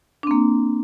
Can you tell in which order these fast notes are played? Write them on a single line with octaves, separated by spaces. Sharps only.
D4 C4 A#3